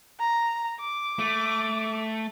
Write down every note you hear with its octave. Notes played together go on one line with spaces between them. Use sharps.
A#5
D6
A3